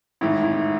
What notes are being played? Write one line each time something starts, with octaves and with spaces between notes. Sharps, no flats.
A1 G#2 D#3 E4
E4